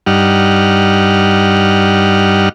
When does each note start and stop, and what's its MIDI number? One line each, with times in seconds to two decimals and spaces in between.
0.06 2.49 43
0.06 2.49 55
0.06 2.49 63
0.06 2.49 78
0.06 2.49 89